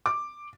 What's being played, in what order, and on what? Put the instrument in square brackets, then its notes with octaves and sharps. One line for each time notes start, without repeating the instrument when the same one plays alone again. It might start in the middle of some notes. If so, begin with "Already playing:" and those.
[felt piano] D6